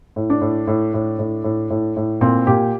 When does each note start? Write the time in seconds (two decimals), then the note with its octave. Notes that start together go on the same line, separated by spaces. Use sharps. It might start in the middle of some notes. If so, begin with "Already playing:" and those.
0.16 A2
0.30 D4
0.41 A2
0.67 A2
0.94 A2
1.19 A2
1.44 A2
1.70 A2
1.97 A2
2.21 A#2 C4
2.47 A#2 G4